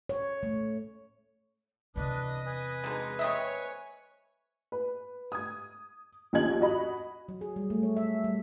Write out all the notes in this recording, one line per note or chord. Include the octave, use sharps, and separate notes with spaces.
C#5
A3
E2 C3 D4 B4 D#5
B4 G#5
B2 D3 G#3 D#4
C4 C#5 D#5 E5
B4
D#6 G#6
A#1 D#2 C#4 D#5 G#6 F#7
F#4 D#5 B5
F#3
G#4
G3
A3
C#5
E5
G3